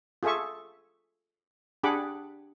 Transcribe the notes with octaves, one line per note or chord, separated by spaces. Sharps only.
F4 G#4 A4 E5 C#6
D4 G4 G#4 F#5 B5 D6